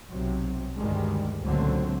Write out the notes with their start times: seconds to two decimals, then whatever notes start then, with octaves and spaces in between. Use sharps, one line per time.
0.11 B1 C3 F#3
0.77 D2 G2 D#3 G3 G#3
1.43 C#2 A#2 D3 F#3 A3 C4